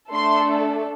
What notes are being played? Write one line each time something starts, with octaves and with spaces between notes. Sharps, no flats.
A3 D4 A4 C6